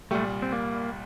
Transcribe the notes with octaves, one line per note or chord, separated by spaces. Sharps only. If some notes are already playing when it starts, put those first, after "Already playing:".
C2 A#2 G3 A3
C4
A#3